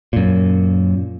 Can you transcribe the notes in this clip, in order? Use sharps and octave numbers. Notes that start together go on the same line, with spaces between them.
F#2 A#2